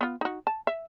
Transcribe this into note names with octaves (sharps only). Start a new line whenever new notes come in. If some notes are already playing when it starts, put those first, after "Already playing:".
B3 F4
D#4 F#4
A5
E5